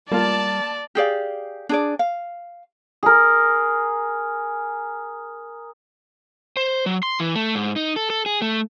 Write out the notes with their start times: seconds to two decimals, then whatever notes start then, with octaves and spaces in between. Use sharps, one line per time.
0.12 G3 A#3 F4 D5 A5
0.95 G4 G#4 D5 F5
1.69 D4 G#4 D5
1.99 F5
3.03 G#4 A#4
6.57 C5
6.86 F#3
7.03 C6
7.20 E3
7.35 A3
7.55 G#2
7.76 D#4
7.96 A4
8.10 A4
8.26 G#4
8.42 A3